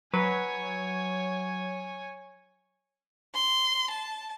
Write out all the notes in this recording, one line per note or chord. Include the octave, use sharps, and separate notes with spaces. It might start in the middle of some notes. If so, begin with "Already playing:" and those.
F#3 B4 C#5 G#5
C6
A5